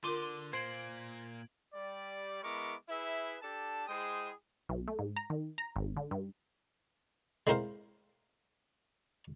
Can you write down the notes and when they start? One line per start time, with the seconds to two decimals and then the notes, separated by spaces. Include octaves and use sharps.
0.04 D3 F4 A#4 D5 C6 D6 D#7 G7
0.53 A#2 A#3 C5 G#6 D7 F#7
1.74 G3 D5
2.43 G#3 B3 E4 A#4 C#6 D6
2.89 E4 G#4 B4 E5
3.42 D4 G4 A4 A5
3.88 G#3 E4 G#4 C5 G5 D#6
4.69 B1
4.88 A3
4.99 G#2
5.16 A#5
5.30 D#3
5.58 A#5
5.76 G#1
5.97 D3
6.11 G2
7.47 G#3 C4 E4 A#4 C5 F5